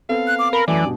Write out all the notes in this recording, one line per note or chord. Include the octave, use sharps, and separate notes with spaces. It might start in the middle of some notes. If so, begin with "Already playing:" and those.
B3 C4 A4 F5
F#6
D6
A#4 B5
F#2 E3 F#3 A3 D5 G#5
G2 B2